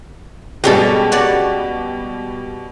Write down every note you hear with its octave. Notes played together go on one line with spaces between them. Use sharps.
B2 G3 G#3 C#4 G4 A4
F#4 C#5 D5